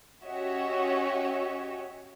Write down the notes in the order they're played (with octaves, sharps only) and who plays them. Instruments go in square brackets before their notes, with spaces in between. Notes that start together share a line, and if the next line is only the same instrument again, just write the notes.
[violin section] C#4 F#4 G4 C#5 D#5 E5